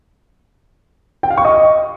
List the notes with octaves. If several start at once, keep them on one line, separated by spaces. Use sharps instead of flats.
G5
F5
C#6
D#5